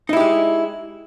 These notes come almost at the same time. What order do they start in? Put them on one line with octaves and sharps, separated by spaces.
D#4 E4 G4 G#3